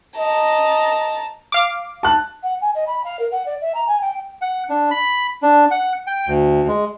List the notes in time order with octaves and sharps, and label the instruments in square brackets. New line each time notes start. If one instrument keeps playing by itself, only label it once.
[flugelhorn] D#5 [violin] A5 A#5
[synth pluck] F5 D6
[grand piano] A5 F#6
[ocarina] F#5
G#5
D#5
B5
F5
A#4
F#5
D5
E5
A#5
G#5
G5
[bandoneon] F#5
D4
B5
D4
F#5
G5
D2
G#3